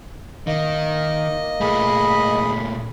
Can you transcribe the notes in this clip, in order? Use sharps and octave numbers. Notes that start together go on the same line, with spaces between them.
D#3 A#3 D#5
A#2 A3 G#4 B5